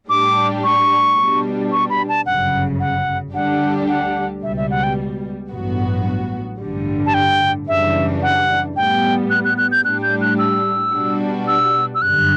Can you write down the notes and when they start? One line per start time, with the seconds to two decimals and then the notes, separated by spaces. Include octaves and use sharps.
0.09 A2 G3 D4 G4 D6
0.64 C#6
1.18 B2 G3 D4
1.72 C#6
1.90 B5
2.09 A5
2.26 G1 F#2 C#3 F#5
2.80 F#5
3.34 D2 D3 G3 D4 G4 F#5
3.89 F#5
4.42 C#2 B2 G3 E5
4.57 E5
4.71 F#5
4.83 G5
5.52 A1 G2 F#3 B3 F#4
6.60 A1 G2 D3 G3
7.06 A5
7.14 G5
7.68 F#2 C#3 E3 G3 D4 E5
8.22 F#5
8.76 A2 G3 B3 G5
9.30 F#6
9.45 F#6
9.58 F#6
9.72 G6
9.84 A2 G3 D4 G4 F#6
10.03 G6
10.21 F#6
10.39 E6
10.93 B2 G3 D4 F#4
11.48 E6
11.95 E6
12.02 G1 F#2 D3 G3 F#6